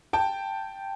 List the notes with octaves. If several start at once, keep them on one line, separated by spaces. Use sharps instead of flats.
G5 A5